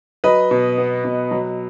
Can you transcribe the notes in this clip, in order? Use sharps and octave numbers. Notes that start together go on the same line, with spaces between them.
F#3 B4 D#5
B2
B3
B2
F#3